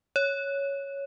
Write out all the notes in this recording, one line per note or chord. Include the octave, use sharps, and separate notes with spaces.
C#5